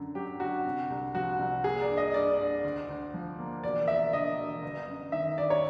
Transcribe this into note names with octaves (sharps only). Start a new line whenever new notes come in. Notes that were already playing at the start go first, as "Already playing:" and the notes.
Already playing: F#2 D3
F#3 G4
D3 F#4
C3
C2
F3 F#4
C2
A#3 G#4
D5
G2
D#5
G2 D5
G2
D2
D2
F3
A#3
E1 D5
E1 E5
D3 D#5
E1
G1
F#2
D#3 E5
G1 D5
C#5